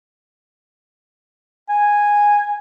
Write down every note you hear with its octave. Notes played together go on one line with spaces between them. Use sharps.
G#5